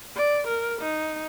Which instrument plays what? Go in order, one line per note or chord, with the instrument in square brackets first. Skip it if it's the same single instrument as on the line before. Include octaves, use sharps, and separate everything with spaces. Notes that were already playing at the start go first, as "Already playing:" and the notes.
[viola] D5
A#4
D#4